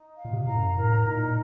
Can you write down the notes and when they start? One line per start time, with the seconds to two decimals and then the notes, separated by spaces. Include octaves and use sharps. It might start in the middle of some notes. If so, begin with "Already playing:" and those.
Already playing: D#4
0.18 F5
0.25 A#2
0.33 C3
0.47 A2 A#5
0.55 F#2
0.77 A2 A#4
1.05 A#2 D#4